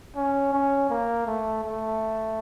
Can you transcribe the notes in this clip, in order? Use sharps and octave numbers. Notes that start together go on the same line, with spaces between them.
C#4
C#4
A#3
A3
A3